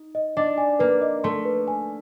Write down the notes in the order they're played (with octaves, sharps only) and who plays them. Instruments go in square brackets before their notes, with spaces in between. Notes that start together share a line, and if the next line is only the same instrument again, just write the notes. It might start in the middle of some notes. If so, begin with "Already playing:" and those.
Already playing: [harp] D#4
[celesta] D#5
[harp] D4 [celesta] D#5
[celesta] G#5
[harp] A#3 [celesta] B4
[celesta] D#5
[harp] A3 [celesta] C6
[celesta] B4
G#5